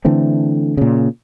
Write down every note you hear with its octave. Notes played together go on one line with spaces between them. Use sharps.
D3 E3 A3 C4
A#2 C#3